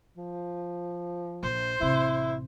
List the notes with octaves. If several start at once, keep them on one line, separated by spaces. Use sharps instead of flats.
F3
A#1 C5
A1 C3 E4